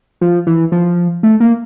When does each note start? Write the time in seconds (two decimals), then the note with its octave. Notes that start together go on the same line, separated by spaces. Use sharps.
0.21 F3
0.47 E3
0.72 F3
1.23 A3
1.40 A#3